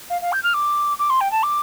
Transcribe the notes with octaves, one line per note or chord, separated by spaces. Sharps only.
F5
F5
G6
F6
D6
D6
C6
G5
A5
D6